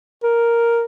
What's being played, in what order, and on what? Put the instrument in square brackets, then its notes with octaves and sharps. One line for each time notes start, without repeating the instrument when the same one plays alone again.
[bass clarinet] A#4